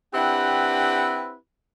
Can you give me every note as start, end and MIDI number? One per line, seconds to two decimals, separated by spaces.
0.14 1.35 60
0.14 1.35 62
0.14 1.35 64
0.14 1.35 67
0.14 1.35 71
0.14 1.35 78